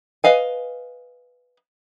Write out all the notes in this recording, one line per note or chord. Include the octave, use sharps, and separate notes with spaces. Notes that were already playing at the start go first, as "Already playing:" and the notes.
B4 D#5 F5 G#5